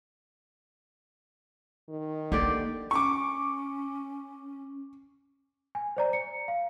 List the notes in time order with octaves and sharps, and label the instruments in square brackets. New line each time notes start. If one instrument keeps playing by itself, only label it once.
[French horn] D#3
[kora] D3 G4 D5 [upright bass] A#3
[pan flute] C#4 [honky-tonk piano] C#6 D6
[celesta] G#5
C5 D5 A#5
C#7
F5